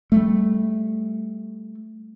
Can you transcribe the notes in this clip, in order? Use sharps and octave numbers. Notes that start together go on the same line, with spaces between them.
G3 A3